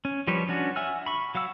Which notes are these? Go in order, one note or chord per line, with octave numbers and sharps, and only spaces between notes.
C#4
F3 G3 B4 C#5
C#4 D4 F#4
E5 F#5 G#5 E6 F6
B5 C#6
F#3 F5 F#5 E6